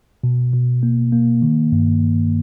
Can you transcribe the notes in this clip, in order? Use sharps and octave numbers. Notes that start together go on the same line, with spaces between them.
B2
B2
A#3
A#3
D#3
G2